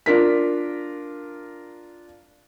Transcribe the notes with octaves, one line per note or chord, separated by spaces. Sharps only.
D4 F4 A#4 B6